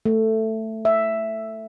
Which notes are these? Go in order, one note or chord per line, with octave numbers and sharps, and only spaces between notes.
A3
E5